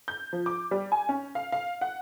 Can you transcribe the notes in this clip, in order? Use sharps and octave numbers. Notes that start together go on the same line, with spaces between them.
G6
F3
D6
G3
G#5
C#4
F5
F5
F#5